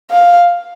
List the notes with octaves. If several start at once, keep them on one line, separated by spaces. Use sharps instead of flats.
F5